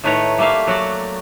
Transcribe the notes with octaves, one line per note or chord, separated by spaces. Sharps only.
A2 D#3 A3 B4 C#5 A#5
G3 A3 A#3 E5 F5
F#3 F#4 D5